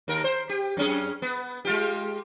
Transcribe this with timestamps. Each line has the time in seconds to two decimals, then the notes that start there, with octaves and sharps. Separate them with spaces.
0.08 D#2 A#4
0.24 C5
0.49 G4
0.77 F#2 C#4 G#4
1.22 B3
1.65 G#3 F4 G4